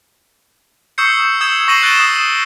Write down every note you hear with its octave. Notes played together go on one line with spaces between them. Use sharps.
C#6 D#6 E6 G6 C7 C#7
C#6 D#6 E6 G6 G#6 E7
C#6 A#6 C7 D#7 F#7
F#6 A6 C7 D7 E7 G7
D#6 C7